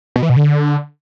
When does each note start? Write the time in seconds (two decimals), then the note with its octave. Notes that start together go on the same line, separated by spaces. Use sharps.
0.16 B2
0.23 E3
0.29 B2
0.36 D3